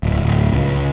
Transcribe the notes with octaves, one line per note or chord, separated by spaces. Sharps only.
D1
D1
C#2